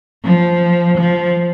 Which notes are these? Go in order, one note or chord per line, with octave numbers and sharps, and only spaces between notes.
F3
F3